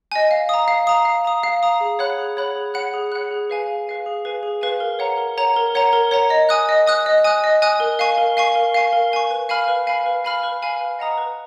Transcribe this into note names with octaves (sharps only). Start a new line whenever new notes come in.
D#5 G#5
F5
A#5 D#6
F5
A#5 D#6
F5
A#5 D#6
F5
A#5 D#6
G#4
C#5 F#5 B5 F#6
G#4
C#5 F#5 B5 F#6
G#4
C#5 F#5 B5 F#6
G#4
C#5 F#5 B5 F#6
G#4
B4 F5 G#5
G#4
B4 F5 G#5
G#4
B4 F5 G#5
G#4
B4 F5 G#5
A#4
C#5 F#5 A#5
A#4
C#5 F#5 A#5
A#4
C#5 F#5 A#5
A#4
C#5 F#5 A#5
D#5
G#5 D#6 F#6
D#5
G#5 D#6 F#6
D#5
G#5 D#6 F#6
D#5
G#5 D#6 F#6
A#4
F5 G#5 C#6
A#4
F5 G#5 C#6
A#4
F5 G#5 C#6
A#4
F5 G#5 C#6
B4
F5 G#5 B5 F6
B4
F5 G#5 B5 F6
B4
F5 G#5 B5 F6
B4
F5 G#5 B5 F6
B4
D#5 F#5 A#5 D#6
B4